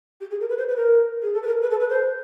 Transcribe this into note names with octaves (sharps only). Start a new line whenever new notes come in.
G4
G#4
A#4
B4
C5
B4
A#4
G#4
A4
B4
A#4
B4
A4
B4
C5